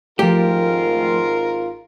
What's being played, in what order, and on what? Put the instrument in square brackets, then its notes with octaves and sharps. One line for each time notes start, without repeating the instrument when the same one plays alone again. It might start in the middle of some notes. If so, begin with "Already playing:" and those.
[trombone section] G#1 F4 [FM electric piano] F3 A3 [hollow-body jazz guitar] G4 [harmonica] A#4